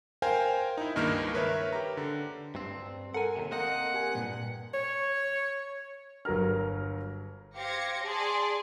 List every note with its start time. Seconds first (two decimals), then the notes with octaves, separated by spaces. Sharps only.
0.22 A#4 C5 F5 G5 G#5
0.77 D#4 E4
0.95 C#2 G2 D#3 A#3 F6
1.33 A#4 B4 C#5 E5
1.73 G4 A#5
1.97 D3
2.55 G2 C4
3.14 A4 A#4 F#5 G#5
3.36 D#2 C3
3.51 A#3 C4 D#5 F#5
3.94 G4 A#4 G#5
4.15 G2 A#2
4.74 C#5
6.25 G1 F#3 A#4 A#5 F6
7.55 G4 C5 F5 G#6 A#6 C#7
8.03 G#4 D5 A5 C6